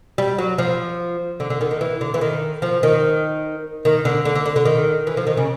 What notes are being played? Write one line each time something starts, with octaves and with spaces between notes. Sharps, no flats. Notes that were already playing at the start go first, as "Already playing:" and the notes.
G3
F#3
F3
D3
D3
D#3
D#3
E3
D3
E3
D#3
F3
D#3
D#3
D3
D3
D3
D3
D3
D#3
E3
F3
D#3
C#3